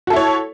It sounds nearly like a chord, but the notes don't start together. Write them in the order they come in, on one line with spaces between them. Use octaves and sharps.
F#4 A4 E4 C#5